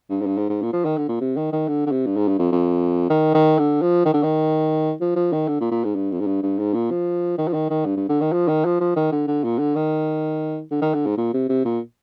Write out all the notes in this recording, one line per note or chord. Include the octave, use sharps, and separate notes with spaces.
G2
G#2
G2
G#2
G#2
A#2
F3
D#3
D3
A#2
C3
D#3
D#3
D3
D3
C3
G2
G#2
G2
F2
F2
D#3
D#3
D3
F3
D#3
D3
D#3
F3
F3
D#3
D3
A#2
A#2
G#2
G2
F2
G#2
G2
G2
G#2
A#2
F3
D#3
F3
D#3
D#3
G2
G2
D3
D#3
F3
D#3
F3
F3
D#3
D3
D3
A#2
D3
D#3
D3
D#3
D3
G#2
A#2
C3
C3
A#2